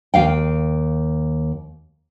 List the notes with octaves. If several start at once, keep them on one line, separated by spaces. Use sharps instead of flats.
D#2 F5 G5